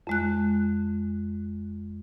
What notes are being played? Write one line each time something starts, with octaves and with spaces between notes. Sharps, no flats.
F2 G#3 F#6